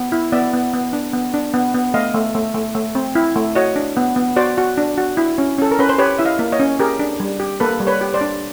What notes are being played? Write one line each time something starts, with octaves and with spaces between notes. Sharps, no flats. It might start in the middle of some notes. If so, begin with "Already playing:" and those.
Already playing: B3
E4
B3 D5 E5
B3
B3
D4
B3
D4
B3
B3
A3 D#5 F5
A3
A3
A3
A3
C4
E4
A3
F#4 C#5 D#5
D4
B3
B3
F#4 C5 D5
F#4
D4
F#4
E4
C#4
C#4 A4
A#4
C#4 B4
C5
G4 B4 C#5
E4 E5
D#5 F5
A#3
C#5 D#5
C#4
G4 G#4 A#4
D4
G3
G4
A#3 A4 B4
G3
B4 C#5
G4
C5 D5
D4